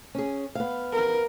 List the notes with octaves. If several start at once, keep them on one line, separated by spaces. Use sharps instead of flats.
C#4 G#4
B3 F5
A#4